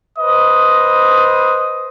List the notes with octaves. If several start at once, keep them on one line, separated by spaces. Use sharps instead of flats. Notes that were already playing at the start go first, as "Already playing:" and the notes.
B4 C5 D#5 D#6